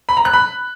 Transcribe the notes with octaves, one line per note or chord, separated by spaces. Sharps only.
B5
A#5
F#6
B5